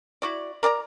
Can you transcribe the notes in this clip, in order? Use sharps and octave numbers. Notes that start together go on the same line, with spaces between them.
E4 F#4 D5
A#4 D5 A5 A#5